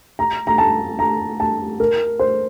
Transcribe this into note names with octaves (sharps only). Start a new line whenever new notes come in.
A#5
A#5
A5
A#5
A5
A#4
C5